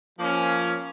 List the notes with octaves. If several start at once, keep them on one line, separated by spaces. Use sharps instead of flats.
F3 A#3 C#4